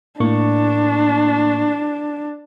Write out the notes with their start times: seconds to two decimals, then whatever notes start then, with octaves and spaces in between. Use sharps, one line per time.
0.20 A2 A#3 D4 C#6